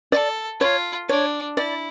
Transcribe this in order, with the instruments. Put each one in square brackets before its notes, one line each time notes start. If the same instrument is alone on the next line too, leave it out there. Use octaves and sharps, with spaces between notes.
[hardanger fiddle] A4 [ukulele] D5
[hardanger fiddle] F4 [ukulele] C#5
[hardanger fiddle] D4 [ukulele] C#5
[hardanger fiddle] E4 [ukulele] D5